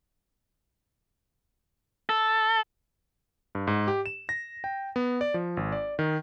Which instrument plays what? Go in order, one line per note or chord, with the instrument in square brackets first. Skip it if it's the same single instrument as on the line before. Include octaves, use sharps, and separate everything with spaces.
[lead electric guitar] A4
[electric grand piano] G2
G#2
G4
E7
A#6
G5
B3
D5
F3
G#1
D5
D#3